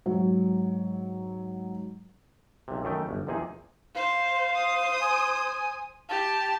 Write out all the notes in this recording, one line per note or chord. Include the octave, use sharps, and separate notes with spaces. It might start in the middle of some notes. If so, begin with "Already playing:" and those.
G#2 F#3
B1 C3
F#2 D#3 A3 G5
G1
A#1 E2 C3 D#4 G#4
C5 F5
C5 D#6
G#5
G4 A5